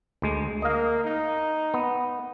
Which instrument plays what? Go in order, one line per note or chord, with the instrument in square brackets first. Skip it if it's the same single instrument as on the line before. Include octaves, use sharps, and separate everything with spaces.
[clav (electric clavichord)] D2 G#3
[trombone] A#3 [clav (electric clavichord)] D#5 F5
[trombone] D#4
[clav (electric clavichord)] B3